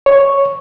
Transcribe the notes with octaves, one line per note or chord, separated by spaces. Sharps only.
C#5